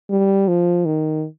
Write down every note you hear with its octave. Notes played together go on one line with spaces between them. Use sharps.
G3
F3
D#3